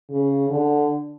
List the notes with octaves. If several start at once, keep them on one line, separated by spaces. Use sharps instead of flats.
C#3
D3